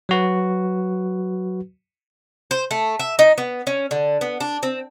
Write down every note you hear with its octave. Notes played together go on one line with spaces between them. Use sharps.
F#3 F#4 B4
C5
A3
E5
D#4
B3
C#4
D3
B3
D4
C4